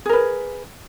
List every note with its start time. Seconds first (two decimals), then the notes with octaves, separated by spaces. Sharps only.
0.06 G#4
0.09 A#4
0.13 B4